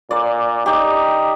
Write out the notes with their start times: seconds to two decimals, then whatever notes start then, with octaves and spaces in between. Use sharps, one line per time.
0.11 A#2 D5
0.66 D#4 G4 D5